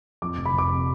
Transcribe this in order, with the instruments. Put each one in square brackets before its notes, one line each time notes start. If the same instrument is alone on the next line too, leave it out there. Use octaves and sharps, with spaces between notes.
[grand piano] F2 D6
F1
B5
F1 D6
C3